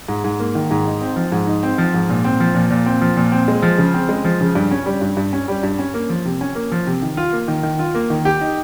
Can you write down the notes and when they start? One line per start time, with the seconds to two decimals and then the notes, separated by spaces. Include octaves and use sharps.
0.08 G#2
0.24 G#2
0.40 A#3
0.55 D#3
0.71 G#2
0.85 D#4
1.01 C4
1.16 F3
1.32 G#2
1.47 D#4
1.63 C4
1.78 F3
1.94 G#2
2.09 A#2
2.24 C4
2.40 F3
2.55 A#2
2.71 A#2
2.86 C4
3.01 F3
3.17 A#2
3.32 C4
3.48 G#3
3.62 F3
3.78 C#3
3.94 C4
4.09 G#3
4.25 F3
4.41 C#3
4.55 G2
4.71 C#4
4.86 G3
5.02 G2
5.17 G2
5.33 C#4
5.48 G3
5.63 G2
5.79 C#4
5.94 A#3
6.09 F3
6.25 C3
6.41 C#4
6.55 A#3
6.72 F3
6.87 C3
7.02 D#3
7.17 F4
7.33 A#3
7.48 D#3
7.63 D#3
7.79 F4
7.95 A#3
8.10 D#3
8.25 G4
8.41 D#4